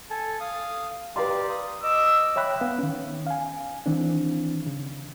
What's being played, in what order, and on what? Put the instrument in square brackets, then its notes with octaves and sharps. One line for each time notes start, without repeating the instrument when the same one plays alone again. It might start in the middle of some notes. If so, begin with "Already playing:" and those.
[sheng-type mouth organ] A4 G#5 A5
F5 D#6
[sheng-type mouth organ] G4 D5 F5 [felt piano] B4 A#5 C6
[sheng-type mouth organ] D#6
[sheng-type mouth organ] D#5 D6 [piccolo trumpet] E6
[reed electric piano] C#5 E5 G5 B5 F#6
B3 F5
D#3 C#4
F5 G#5
D#3 E3 C4 D4
C#3